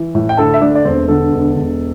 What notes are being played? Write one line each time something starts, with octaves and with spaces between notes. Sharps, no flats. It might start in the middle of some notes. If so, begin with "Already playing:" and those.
Already playing: E3
A2
G5
D2 A4 A5
E5
A3 D4 D5
D5
E1 C4 C5
D3 A4
E1
E1